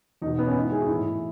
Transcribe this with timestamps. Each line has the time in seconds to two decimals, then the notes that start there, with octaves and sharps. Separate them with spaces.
0.22 E2 D#4
0.26 B2
0.39 B3
0.47 C#4
0.54 G#2 D#4
0.60 D#3 E4
0.72 G#4
0.80 F#4
0.87 A2 E3 E4